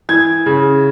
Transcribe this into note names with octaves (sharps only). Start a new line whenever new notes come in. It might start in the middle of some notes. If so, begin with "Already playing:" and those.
E3 G#6
C#3